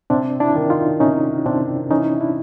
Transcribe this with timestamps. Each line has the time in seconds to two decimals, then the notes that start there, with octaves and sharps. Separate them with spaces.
0.10 C3 C4 D4
0.40 D4 E4
0.55 D#3
0.70 D#4 F4
1.00 C3 C#4 D#4
1.45 C3 C4 D4
1.91 E3 C#4 D#4
2.21 D4 E4